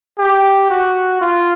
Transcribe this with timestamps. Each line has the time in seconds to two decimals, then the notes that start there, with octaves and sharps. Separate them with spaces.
0.19 G4
0.70 F#4
1.22 F4